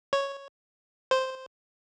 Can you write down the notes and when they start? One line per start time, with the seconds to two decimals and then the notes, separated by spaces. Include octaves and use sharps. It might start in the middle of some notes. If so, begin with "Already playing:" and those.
0.13 C#5
1.11 C5